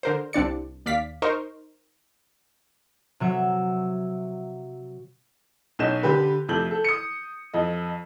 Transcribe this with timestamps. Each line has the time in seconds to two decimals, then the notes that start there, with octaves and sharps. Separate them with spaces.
0.03 D3 A#4 C5
0.33 C2 C4 D4 D5 C#7
0.86 D#2 D5 F5 B6
1.22 D#4 A#4 C5 C#6
3.20 C3 F#3 E5
5.79 B1 C#4 D#5 G6 E7
6.03 D3 G4 B4
6.48 F2 C3 A3 G6 F#7
6.71 A4
6.84 D#6 C#7
7.54 F2 D#5